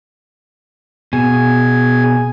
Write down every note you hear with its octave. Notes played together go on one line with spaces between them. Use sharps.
B2 G#4 G#5